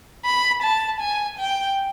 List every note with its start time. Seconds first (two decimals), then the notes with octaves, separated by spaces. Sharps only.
0.25 B5
0.63 A5
1.00 G#5
1.39 G5